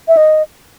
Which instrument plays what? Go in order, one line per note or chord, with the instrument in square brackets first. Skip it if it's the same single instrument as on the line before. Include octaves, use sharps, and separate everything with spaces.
[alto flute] E5
D#5